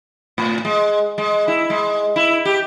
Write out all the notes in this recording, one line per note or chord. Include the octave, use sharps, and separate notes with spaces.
A2
G#3
G#3
E4
G#3
E4
G4